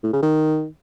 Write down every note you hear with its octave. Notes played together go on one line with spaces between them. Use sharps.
A2
C#3
D#3